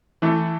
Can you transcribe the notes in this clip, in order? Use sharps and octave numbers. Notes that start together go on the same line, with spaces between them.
E3 A3 E4 A4